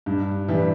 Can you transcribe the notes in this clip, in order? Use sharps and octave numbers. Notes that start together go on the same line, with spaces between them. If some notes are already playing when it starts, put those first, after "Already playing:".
G2
E3 G3